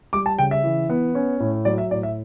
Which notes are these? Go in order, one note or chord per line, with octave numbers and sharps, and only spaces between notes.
G3 D6
A5
C#3 G5
E5
E3
B3
C#4
A2
F#3 D5
E5
A2 D5
E5